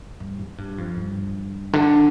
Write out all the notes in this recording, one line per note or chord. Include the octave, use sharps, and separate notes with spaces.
G2
G#2
G2
F2
G2
D3